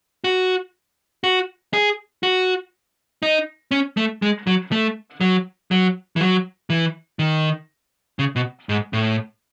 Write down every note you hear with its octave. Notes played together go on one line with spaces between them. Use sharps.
F#4
F#4
G#4
F#4
D#4
C#4
A3
G#3
F#3
A3
F#3
F#3
E3
F#3
E3
D#3
C#3
B2
G#2
A2